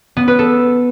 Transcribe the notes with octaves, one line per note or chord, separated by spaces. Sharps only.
B3
B4
A4